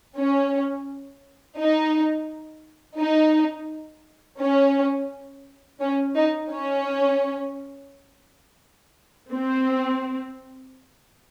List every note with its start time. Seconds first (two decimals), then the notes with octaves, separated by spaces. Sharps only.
0.18 C#4
1.59 D#4
2.99 D#4
4.40 C#4
5.80 C#4
6.16 D#4
6.51 C#4
9.32 C4